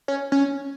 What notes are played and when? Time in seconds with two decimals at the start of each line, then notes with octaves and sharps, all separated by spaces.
0.08 C#4
0.32 C#4